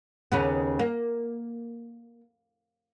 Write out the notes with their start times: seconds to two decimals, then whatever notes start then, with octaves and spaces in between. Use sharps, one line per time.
0.32 D#2 C#3 B3
0.79 A#3